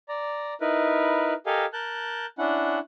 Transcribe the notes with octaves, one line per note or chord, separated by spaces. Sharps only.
D5 A#5
D#4 E4 A#4 B4
G4 A4 A#4 D#5 F5 G#5
A#4 A5 F#6 G6
C#4 D4 E4 F#5